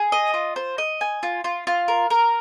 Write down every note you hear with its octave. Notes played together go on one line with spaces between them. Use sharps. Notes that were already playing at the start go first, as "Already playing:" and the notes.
Already playing: G#4
D#5
F4
C5
D#5
G#5
F4
F4
F4
A#4
A#4